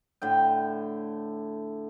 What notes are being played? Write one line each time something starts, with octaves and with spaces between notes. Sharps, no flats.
A2 D3 G5